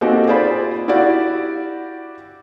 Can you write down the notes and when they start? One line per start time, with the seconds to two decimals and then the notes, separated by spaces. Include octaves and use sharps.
0.01 A#3 C4 D#4 F#4 G4 A4
0.27 F4 G#4 C5 D5 B5
0.88 E4 F#4 G4 D5 F5 F#5